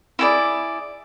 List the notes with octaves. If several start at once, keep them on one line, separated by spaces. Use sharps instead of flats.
E4 G#4 D5